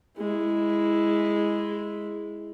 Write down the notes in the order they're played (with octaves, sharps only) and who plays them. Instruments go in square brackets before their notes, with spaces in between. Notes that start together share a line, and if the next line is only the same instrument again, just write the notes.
[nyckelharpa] G#3 E4